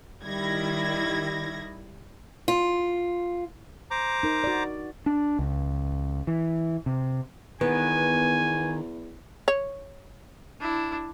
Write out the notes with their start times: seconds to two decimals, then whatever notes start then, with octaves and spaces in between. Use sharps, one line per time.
0.24 D#3 G3 E4 G#6 A#6
2.48 F4
3.91 C5 A#5 D6
4.23 D#4 A#4
4.44 F#4 D5
5.06 D4
5.39 C#2
6.27 E3
6.86 C3
7.61 E2 D#3 B3 G#5
9.48 C#5
10.60 D4 E4